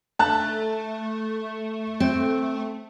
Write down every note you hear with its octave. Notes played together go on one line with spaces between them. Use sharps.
A3 A5 F#6
C4